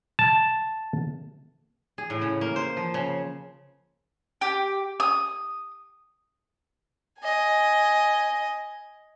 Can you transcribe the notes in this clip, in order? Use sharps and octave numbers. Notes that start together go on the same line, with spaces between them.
A5
G#4
A2
C#3
A#3
C5
F3
C#3
G4
D#6
D#5 G#5